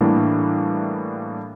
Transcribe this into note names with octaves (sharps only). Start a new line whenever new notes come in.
A2 E3 G3 A#3 D4